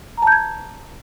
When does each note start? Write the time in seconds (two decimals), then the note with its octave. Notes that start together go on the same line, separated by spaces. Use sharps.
0.18 A#5
0.22 A5
0.27 G6
0.32 G#6